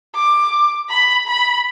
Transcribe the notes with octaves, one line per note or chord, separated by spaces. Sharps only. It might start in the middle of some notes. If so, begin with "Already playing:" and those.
D6
B5
B5